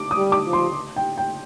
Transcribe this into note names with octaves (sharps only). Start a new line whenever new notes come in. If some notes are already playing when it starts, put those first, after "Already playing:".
Already playing: D6
D#6
G3
D6
F3
C6
G5
G5